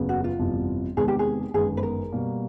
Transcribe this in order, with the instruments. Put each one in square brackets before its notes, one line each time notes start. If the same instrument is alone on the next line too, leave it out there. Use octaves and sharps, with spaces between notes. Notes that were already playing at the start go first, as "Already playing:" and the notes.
Already playing: [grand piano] F#1 E2 C#3 F#3 B3
[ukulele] F#4
F4
[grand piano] G1 F2 C3 E3 G3
[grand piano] E2 C3 D#3 G#3 B3 [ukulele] G#4
[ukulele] G4
G#4
[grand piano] G1 F#2 D#3 G#3 B3 [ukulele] G#4
[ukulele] B4
A#4
[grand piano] B2 G3 A#3